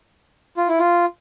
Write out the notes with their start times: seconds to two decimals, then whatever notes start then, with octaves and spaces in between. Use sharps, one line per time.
0.57 F4
0.68 E4
0.79 F4